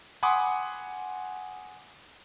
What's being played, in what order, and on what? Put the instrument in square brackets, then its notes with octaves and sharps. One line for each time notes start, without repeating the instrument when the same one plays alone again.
[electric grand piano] F#5 G#5 B5 C6 D6 D#6